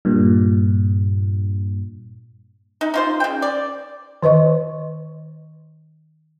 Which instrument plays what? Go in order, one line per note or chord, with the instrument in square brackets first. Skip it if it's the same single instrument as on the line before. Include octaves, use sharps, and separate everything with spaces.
[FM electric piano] G2 A#2
[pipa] D#4
D#4 F4 C5
C#3 G5
D5
[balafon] D#3 B4 D#5 C#6